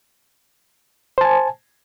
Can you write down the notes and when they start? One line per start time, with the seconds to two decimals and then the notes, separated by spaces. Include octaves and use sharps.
1.18 C5
1.21 A5
1.24 G#5